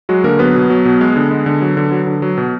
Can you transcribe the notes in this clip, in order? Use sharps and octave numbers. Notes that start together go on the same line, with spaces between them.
F#3 G#3 F#4
D3 A#3 A#4
F#3 B3 B4
B2
F#3
B2
G#3
D3
G#3
D3
F#3
D3
F#3
D3
F#3
B2